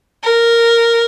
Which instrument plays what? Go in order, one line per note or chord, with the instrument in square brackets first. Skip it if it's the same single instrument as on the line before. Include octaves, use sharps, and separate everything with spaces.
[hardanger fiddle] A#4